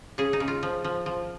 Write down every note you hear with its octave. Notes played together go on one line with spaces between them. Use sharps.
C#3 G#4
D#4
C#3
F4
F3
F3
F3